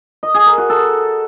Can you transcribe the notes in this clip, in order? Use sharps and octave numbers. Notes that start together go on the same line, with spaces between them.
D#5
G#4
A#4
F#4
A4